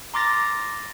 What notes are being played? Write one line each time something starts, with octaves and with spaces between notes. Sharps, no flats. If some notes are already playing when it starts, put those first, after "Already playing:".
A#5 C6 D6 F6 A6 A#6